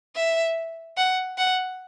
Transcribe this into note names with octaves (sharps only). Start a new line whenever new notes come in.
E5
F#5
F#5